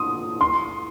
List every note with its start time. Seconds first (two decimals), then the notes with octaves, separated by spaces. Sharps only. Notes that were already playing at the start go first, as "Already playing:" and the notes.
Already playing: C6 D#6
0.41 C6